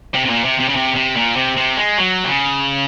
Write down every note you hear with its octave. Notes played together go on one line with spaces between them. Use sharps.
C3
C3
A#2
C3
C3
C#3
C3
C3
A#2
C3
C3
G#3
F#3
C3
C#3